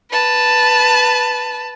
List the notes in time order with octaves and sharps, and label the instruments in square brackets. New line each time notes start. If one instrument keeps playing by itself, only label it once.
[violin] B4 A5